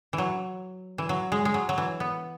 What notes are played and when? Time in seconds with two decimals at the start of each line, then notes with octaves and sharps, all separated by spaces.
0.13 E3
0.18 F#3
0.98 E3
1.09 F#3
1.32 G#3
1.45 G#3
1.54 F#3
1.69 F#3
1.78 E3
2.00 B3